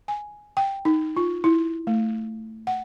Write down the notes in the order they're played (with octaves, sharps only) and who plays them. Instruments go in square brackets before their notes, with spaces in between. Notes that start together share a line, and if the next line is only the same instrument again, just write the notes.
[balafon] G#5
G5
D#4
F4
E4
A3
F#5